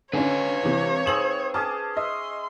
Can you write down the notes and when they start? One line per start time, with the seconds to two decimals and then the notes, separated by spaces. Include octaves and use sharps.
0.13 D3 C#4 B4 C#5 F5 G#5
0.63 C3 E3
1.06 C4 D#4 G#4 E7 F#7
1.54 C#4 G#4 A5 D6 D#6
1.97 D#5 E5 C6